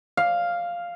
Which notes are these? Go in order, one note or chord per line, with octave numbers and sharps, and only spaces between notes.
F5